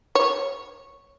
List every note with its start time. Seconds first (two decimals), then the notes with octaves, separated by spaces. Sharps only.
0.15 C#5